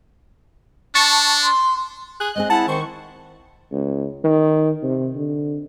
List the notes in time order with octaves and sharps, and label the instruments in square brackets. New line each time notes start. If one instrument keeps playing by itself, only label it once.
[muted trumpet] D4 [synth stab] A5 C#6
[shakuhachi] C6
[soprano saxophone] G#4 [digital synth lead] F#6
[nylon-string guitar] G#3 C4 G#4 [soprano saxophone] D#5
[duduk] E4 [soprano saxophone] F#5 [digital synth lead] A5
[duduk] D#3 [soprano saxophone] C5 [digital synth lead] C#6
[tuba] C#2
D#3
C3
D3